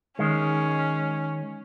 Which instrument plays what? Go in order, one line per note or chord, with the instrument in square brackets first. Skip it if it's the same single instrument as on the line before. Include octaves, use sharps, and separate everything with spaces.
[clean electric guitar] D#3 G#3 [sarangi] C#4